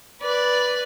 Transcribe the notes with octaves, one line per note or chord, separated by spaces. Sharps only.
B4 D5